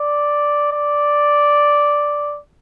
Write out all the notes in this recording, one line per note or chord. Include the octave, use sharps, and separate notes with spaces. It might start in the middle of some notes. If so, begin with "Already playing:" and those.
Already playing: D5
D5